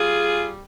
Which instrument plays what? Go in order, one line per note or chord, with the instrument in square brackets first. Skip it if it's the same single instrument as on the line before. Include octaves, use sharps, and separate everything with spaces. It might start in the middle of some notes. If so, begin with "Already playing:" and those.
Already playing: [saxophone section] G3 F4 G#4